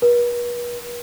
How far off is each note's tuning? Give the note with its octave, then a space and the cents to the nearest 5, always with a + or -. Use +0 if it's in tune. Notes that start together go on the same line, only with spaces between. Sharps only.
B4 -45